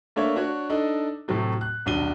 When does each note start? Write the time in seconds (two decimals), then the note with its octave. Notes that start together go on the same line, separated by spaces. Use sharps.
0.16 A3 A#3 D4 C#5 E5
0.36 D4 F#4 C#5
0.70 D4 D#4 A4 D#5
1.28 A2 C3 F#3 A3
1.61 F#6
1.86 D#1 B1 D4 D#7 G7